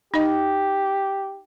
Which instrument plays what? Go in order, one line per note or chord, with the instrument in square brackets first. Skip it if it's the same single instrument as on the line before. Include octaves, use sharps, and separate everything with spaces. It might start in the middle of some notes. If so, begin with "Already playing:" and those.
[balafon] D#4 D#5 [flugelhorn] G4